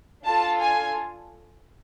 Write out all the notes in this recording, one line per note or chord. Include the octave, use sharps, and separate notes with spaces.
D4 F4 A4 A5
G#5